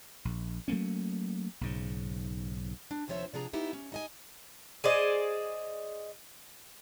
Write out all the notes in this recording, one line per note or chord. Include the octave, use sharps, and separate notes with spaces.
A#1
F#3 A3 A#3 C#4
B1 G#2 C#3
D4
D#2 C3 F3 C5 C#5 E5
C3 F3 D4 G#4 A#5
B3 D#4 E4 G4
C#4
D#4 D#5 G#5
G#4 C5 D5 D#5